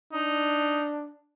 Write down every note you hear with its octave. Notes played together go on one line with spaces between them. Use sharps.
D4 D#4